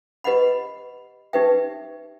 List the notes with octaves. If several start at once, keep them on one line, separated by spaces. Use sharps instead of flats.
G4 B4 D#5 F#5 B5
D#4 G4 B4 E5 G5